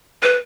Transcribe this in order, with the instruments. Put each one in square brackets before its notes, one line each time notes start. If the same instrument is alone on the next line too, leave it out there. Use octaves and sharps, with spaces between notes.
[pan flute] B4